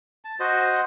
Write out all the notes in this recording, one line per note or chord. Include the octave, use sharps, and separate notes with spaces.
A5
F#4 C5 D#5